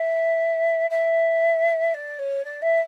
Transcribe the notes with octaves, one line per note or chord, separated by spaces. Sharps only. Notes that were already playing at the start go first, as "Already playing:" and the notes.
Already playing: E5
E5
D5
C#5
D5
E5